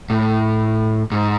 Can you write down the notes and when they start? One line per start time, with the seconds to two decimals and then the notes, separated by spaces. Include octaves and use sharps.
0.10 A2
1.11 G#2